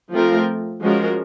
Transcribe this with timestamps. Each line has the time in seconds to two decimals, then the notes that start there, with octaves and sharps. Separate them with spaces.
0.12 F3 A3 C4 F4 A#4
0.82 F3 G#3 C#4 F#4 A#4